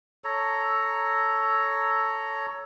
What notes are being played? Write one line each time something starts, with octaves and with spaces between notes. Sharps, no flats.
A4 C#5 A#5